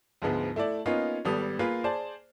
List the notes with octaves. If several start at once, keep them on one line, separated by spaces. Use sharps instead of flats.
D2 G#2 F3 G#3 B3
A3 E4 A4 D5
A#3 B3 C#4 D#4 F4
G#1 G3 B3 A4 D#6
A#3 F4 G#4 A#4 B4
G#4 C5 D5 A5